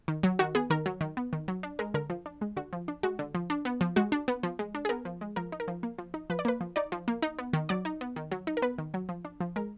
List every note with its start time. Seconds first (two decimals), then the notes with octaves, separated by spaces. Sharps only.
0.08 D#3
0.23 F#3
0.39 D#3 F#4
0.55 B3 G#4
0.70 D#3 A#4
0.86 F#3
1.01 D#3
1.17 B3
1.33 D#3
1.48 F#3
1.63 D4
1.79 G#3 A#4
1.94 D3 A#4
2.10 F3
2.26 D4
2.41 G#3
2.57 D3 F#4
2.73 F3
2.88 D4
3.03 G#3 F#4
3.19 D3
3.35 F3
3.50 D4
3.65 B3
3.81 F3
3.96 G#3 F#4
4.12 D4
4.28 B3
4.43 F3
4.59 G#3
4.75 D4
4.85 G#4
4.89 B3 A#4
5.05 F3
5.21 G#3
5.36 F3 A#4
5.52 D#4
5.60 A#4
5.68 F3
5.83 A#3
5.98 F3
6.14 D#4
6.30 F3 B4
6.39 D5
6.45 A#3 B4
6.61 F3
6.76 D#4 D5
6.92 F3
7.08 A#3
7.22 D#4
7.39 B3
7.53 D#3
7.69 F#3 D5
7.85 D#4
8.01 B3
8.16 D#3
8.31 F#3
8.47 D#4
8.57 A#4
8.62 B3 B4
8.78 D#3
8.94 F#3
9.09 F3
9.25 D4
9.40 F3
9.56 G#3 A#4